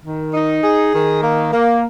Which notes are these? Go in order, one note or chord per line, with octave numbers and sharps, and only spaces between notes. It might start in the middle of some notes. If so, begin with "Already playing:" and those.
D#3
D#4
G#4
D#3
A#3
A#3